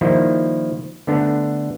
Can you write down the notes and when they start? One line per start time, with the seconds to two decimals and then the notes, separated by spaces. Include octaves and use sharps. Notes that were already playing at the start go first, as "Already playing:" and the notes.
0.01 D#3 F3 G3 A#3 E4
1.07 D3 A3 B3 D4